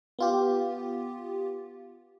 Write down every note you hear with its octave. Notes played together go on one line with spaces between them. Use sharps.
B3 F4 G4